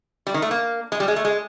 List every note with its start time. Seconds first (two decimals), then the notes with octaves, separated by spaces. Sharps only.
0.27 G3
0.34 D#3
0.42 A3
0.51 A#3
0.92 G#3
1.00 G3
1.08 G#3
1.16 A3
1.25 G#3